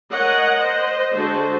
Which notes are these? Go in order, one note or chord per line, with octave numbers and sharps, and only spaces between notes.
A#4 C#5 D#5 F#5
C5 D#5
D3 G#3 F#4 A4 C5